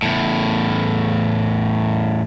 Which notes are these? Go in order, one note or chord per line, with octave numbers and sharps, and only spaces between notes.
E2 A2